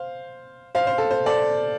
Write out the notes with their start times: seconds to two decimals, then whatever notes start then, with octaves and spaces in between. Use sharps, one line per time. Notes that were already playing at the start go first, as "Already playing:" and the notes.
Already playing: C5 F5
0.75 C5 F5
0.87 C5
0.98 A4
1.11 C5
1.26 A4 D5